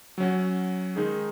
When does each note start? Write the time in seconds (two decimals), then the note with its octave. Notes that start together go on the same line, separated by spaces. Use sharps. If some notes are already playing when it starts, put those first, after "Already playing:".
0.18 F#3 C#4 F#4
0.96 D#3 G#3 D#4 G#4